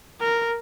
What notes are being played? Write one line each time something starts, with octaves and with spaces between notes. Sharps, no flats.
A#4